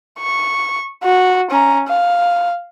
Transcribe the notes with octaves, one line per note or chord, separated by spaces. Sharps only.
C#6
F#4
C#4 A#5
F5